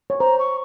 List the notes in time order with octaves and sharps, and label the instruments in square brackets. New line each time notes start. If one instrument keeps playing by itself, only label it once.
[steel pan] C#5
[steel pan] C5 [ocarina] A#5
[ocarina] C#6